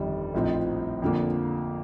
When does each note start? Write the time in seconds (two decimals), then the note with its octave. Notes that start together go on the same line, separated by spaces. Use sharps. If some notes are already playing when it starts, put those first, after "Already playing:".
Already playing: G1 F2 D#3 G3
0.34 A#1 A2 F3 C4 D#4
1.02 F2 D3 F3 A#3